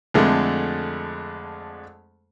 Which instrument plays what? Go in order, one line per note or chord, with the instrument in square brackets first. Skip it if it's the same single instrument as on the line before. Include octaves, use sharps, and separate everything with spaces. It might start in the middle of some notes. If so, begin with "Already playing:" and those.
[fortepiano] F2 D3 G#3 A3